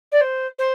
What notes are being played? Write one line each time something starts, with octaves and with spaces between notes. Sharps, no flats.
D5
C5
C5